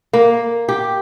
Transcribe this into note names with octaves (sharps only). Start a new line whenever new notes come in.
A#3
G4